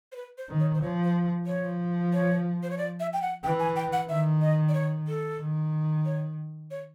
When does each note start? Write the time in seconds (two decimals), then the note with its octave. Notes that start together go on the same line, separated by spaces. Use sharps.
0.12 C5
0.16 B4
0.38 C5
0.49 D#3
0.60 C#5
0.74 C5
0.82 F3 C#5
1.04 C5
1.46 F3 C#5
2.13 C#5
2.63 C5
2.70 C#5
2.78 D5
3.00 E5
3.13 G5
3.22 F#5
3.44 E3 G5
3.59 G#5
3.76 G5
3.93 F#5
4.09 D#3 E5
4.41 D#5
4.69 D5
4.74 C#5
5.08 A4
5.40 D#3
6.05 C#5
6.71 C#5